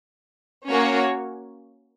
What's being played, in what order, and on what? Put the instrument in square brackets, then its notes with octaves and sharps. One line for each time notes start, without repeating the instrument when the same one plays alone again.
[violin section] A#3 C#4 F#4 C#5